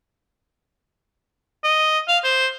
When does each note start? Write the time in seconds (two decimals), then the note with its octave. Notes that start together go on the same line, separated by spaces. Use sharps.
1.64 D#5
2.08 F5
2.24 C5